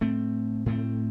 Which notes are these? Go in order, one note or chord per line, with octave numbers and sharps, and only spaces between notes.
A2 A3 C4
A2 A3 C4